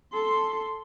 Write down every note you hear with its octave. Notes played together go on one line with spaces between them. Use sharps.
A4 C6